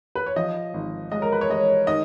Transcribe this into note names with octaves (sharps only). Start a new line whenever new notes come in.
B4
C#5
F3 D#5
G#1
G#3 D#5
A#4
B4
C#5
G#3 D#5
D#3 D#5